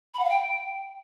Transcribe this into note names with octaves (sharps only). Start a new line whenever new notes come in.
B5
F#5
F5
G5